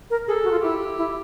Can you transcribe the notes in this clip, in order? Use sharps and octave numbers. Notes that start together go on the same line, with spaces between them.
A#4
G#4 A4
F#4
F4
E4 G4
E4